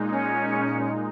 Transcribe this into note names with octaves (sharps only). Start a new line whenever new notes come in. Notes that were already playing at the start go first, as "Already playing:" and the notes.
Already playing: A#2 G#3 D#4
C#4